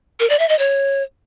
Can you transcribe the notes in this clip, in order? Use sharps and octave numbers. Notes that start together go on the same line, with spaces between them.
A#4
D5
E5
D#5
C#5